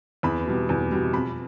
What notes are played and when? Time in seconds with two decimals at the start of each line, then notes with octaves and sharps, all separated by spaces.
0.23 E2 B5
0.46 B2 G3
0.69 E2
0.92 B2 G3
1.13 F2 B5